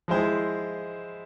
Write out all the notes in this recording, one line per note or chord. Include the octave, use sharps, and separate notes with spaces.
F3 G#3 E4 G#4 C5